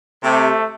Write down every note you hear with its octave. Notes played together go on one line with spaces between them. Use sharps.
C3 A3